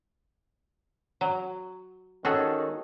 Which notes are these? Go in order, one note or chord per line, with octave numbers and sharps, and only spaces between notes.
F#3
D#3 C#4 F#4 G#4 A4